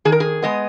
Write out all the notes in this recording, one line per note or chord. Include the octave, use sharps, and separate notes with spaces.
D#3 G#4
A#4
G#4
G#3 B3 D#5